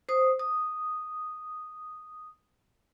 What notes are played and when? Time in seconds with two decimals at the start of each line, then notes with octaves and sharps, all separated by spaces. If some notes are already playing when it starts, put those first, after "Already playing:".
0.09 C5 D#6
0.39 D#6